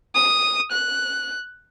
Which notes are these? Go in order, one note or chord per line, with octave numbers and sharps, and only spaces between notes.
D#6
F#6